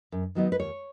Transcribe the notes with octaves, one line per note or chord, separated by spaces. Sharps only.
F#2
D#3 F#3 B3 D#4
B4
D#2 C#5